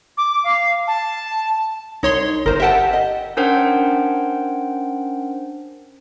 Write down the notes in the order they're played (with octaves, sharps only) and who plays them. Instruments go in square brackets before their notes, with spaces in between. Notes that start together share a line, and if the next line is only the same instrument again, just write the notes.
[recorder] D6
F5
A5
[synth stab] C2 C#5 C6 [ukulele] D#4
[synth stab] G1 C5 [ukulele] A#4
[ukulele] G4 F#5 [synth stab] E5 G5 A5
[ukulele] D#5
[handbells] C#4 D4 A#4 C5 F#5 G5